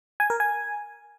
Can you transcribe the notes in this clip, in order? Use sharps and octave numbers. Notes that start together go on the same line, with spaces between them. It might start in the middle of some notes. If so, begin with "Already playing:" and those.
G#5
A#4
G#5